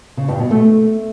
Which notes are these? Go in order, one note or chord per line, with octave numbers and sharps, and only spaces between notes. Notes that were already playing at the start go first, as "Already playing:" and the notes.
C#3
G2
B2
A3